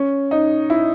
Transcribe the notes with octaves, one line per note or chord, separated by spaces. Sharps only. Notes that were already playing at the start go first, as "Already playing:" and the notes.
Already playing: C#4
D#4
E4